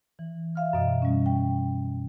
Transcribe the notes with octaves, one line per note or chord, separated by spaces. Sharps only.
E3
E5 F5 F6
F#2 B2 D#5
G3 C#4
G5